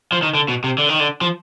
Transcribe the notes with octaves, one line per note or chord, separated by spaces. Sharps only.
F3
D#3
D3
B2
C3
D3
D#3
D3
F3